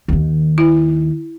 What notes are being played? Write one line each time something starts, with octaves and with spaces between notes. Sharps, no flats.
D#2 D#3
E4